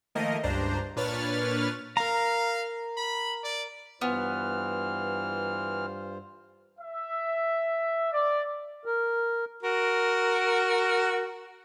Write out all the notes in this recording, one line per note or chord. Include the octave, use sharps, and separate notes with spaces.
D#3 F3 A3 A#3 A#4 D#5
C#2 G2 D4 C5 A#5
A#2 D4 B4 C#5 F6 A6
A#4 F5 A#5
B5
D5
G2 E3 B3 F4 C5 F6
E5
D5
A#4
F#4 A#4